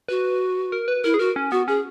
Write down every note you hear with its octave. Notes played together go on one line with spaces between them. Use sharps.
F#4 B4
A#4
B4
E4 A#4
G#4
F#4 A#4
C#4
B3 F#4
C#4 G#4